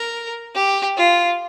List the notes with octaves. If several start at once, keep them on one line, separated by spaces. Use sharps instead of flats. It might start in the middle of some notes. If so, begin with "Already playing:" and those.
Already playing: A#4
G4
F4